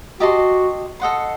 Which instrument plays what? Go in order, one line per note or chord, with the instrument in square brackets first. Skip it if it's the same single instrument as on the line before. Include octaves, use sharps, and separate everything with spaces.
[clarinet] F#4 [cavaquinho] G4 D#5 A5 C6
[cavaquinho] A4 D#5 F#5 C6